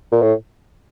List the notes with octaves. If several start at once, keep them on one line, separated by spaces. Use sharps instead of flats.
A#2
A2